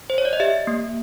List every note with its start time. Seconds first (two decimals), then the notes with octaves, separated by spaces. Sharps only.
0.10 C5
0.18 C#5
0.25 D5
0.33 D#5
0.40 G4 E5
0.67 A#3